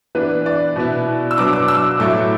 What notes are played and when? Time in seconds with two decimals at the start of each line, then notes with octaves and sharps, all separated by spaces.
0.15 E3 B3 D4 B4
0.46 D5
0.76 B2 B3 E4
1.31 E6
1.37 B2 F#3 B3 D4 D6
1.53 D6
1.68 E6
1.99 A2 F#3 A3 E4 D6